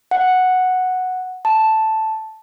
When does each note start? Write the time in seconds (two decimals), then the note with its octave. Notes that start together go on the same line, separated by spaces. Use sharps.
0.11 F#5
1.45 A5